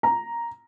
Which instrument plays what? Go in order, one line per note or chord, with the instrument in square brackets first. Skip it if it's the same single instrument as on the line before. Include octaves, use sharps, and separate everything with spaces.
[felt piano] A#5